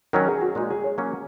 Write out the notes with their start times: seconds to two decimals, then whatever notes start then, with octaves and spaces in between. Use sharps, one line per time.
0.13 D#3 F#3 C#4 A#4
0.27 G#4
0.41 F#4
0.55 A#2 G#3 D#4 F#4
0.70 G#4
0.84 C#5
0.98 F#3 A#3 C#4